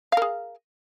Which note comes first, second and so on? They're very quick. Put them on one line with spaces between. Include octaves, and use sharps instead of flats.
F5 A#4 G#4